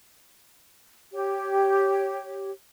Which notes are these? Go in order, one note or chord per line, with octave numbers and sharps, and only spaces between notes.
G4 C#5